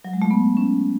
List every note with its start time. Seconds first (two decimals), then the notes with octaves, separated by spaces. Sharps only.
0.05 F#3
0.13 G#3
0.22 A3
0.31 B3
0.57 C#4